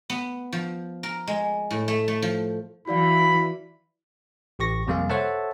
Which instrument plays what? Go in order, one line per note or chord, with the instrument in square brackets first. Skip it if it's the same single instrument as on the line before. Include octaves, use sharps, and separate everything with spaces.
[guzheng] B3
F3
A#4
G#3
A2
A3
A3
F3
[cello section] E3 [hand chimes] F#4 D5 F5 [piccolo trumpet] B5
[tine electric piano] A1 G4 C#6 A#6
F2 C3 G3 A#3 G#4 F5
A4 C5 C#5 E5 F#5 A5